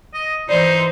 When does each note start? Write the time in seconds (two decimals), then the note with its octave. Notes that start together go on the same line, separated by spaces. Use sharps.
0.14 D#5
0.49 E3 D#4 C5 D5